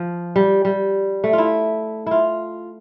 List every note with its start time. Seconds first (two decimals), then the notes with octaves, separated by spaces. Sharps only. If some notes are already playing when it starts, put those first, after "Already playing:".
Already playing: F3
0.36 G3
0.65 G3
1.24 A3
1.33 F4
1.38 E4
2.06 E4 F4